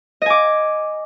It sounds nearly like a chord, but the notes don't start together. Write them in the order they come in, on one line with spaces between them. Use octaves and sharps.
D#5 G#5 D6